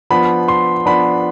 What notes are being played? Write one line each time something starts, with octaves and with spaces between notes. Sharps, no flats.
F3 B3 D4 B5
C6
F3 B3 D4 B5